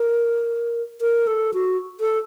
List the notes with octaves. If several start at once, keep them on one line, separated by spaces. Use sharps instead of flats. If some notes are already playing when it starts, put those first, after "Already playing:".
Already playing: A#4
A#4
A4
F#4
A4